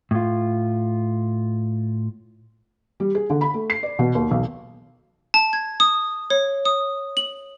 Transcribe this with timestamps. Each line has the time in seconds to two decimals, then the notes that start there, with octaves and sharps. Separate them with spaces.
0.11 A2 F4
3.00 G3
3.15 G#4
3.30 D3
3.41 B5
3.54 A3
3.70 C7
3.83 D5
3.99 B2
4.15 D#2
4.31 B1
5.34 A5
5.53 G#6
5.80 D#6
6.30 C#5
6.65 D#6
7.17 F#7